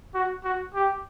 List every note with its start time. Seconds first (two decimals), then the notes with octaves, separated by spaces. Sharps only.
0.15 F#4
0.44 F#4
0.74 G4